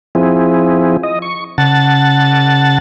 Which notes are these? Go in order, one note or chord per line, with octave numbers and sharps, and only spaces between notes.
F3 C4 E4 G#4
D#5
C#6
C#3 F#5 A5 A6